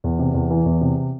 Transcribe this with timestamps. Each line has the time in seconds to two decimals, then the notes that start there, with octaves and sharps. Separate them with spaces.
0.04 E2
0.19 C3
0.34 E2
0.50 E3
0.65 E2
0.81 C3